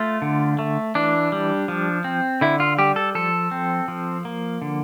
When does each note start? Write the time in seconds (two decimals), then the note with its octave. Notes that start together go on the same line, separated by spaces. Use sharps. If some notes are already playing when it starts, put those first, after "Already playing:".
Already playing: A3 F4
0.22 D3
0.59 A3
0.95 E3 D4
1.32 G3
1.68 F3
2.04 C4
2.41 D3 E4
2.60 F4
2.78 G3 G4
2.96 A4
3.15 F3 A4
3.51 C4
3.88 F3
4.25 A#3
4.62 D3